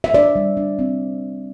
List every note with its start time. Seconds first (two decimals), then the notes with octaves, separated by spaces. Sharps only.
0.04 E5
0.14 D4 D5
0.36 G3
0.57 D4
0.79 C4